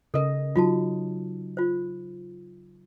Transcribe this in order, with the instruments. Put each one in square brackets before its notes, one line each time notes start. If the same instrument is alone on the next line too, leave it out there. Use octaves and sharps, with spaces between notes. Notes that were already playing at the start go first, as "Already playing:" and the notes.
[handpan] C#3 D#5 [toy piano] A4 A#4
[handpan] F#3 D#4 [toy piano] F4 F#4 A5
[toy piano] F4 C5